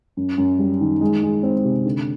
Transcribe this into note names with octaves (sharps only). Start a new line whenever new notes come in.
F#2
F#2
G3
D#3
G#3
G#3
C4
C3
D3